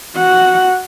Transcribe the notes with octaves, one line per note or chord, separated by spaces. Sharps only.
F#4 F#5